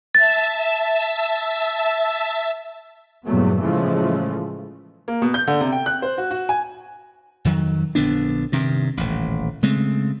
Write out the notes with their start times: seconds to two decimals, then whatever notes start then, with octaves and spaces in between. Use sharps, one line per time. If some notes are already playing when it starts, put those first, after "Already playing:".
0.15 E5 A5 E6 A6
3.26 E2 G2 A#2 F#3 A3 B3
3.61 A2 C#3 E3 F3 G#3 A3
5.08 A#3
5.22 B2
5.34 G6
5.47 D3
5.61 C3
5.72 G5
5.86 F#6
6.02 C5
6.18 F#4
6.31 F#4
6.49 G#5
7.45 F2 D#3 F#3
7.95 A#1 D3 B3 D4
8.52 G2 C3 D#3
8.97 D#1 A1
9.63 C#3 G#3 A3 C4